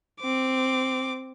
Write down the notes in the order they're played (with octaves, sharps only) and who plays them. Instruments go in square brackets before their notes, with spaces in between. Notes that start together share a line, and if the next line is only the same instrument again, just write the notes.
[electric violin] C4 D6